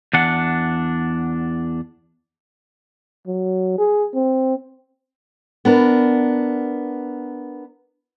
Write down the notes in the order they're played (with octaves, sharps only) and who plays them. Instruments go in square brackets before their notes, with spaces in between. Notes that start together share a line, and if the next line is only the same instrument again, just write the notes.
[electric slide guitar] E2 D4 F#5
[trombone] F#3
G#4
C4
[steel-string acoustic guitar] B3 D4 A#4